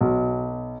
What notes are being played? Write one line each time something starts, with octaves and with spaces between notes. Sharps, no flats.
B1